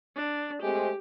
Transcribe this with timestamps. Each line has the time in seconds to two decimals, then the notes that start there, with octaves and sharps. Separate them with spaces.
0.16 D4
0.62 G#3 A3 C4 G4